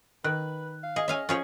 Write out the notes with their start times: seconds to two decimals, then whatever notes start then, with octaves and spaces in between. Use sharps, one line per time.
0.24 D#3 B4 F#6
0.83 F5
0.96 G#4 D#5
1.08 C#4 E5 F5 G#5
1.29 F3 C#4 G#4 C#5